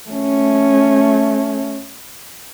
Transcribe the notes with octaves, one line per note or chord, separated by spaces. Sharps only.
A3 C#4